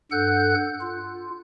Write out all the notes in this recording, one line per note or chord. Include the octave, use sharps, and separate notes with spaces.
G2 A4 F#5 F#6 G6
F4